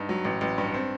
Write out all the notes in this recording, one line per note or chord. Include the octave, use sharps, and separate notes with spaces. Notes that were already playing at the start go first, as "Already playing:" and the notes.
Already playing: G2 D#4
F#3
A1
A1
G2
C4